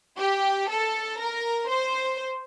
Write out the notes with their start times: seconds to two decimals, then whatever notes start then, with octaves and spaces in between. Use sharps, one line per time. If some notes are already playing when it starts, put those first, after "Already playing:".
0.19 G4
0.69 A4
1.19 A#4
1.69 C5